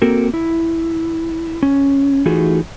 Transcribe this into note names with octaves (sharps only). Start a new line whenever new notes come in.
A#3 C4 F#4 A4 A#4
E4
C#4
E3 A3 D#4 F4 F#4 G#4